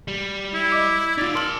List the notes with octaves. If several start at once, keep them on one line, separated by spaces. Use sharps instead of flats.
G3
E4
D#5 D6
D#4 F4 D5 E6 G#6
A#4 A5 C6 F6 F#7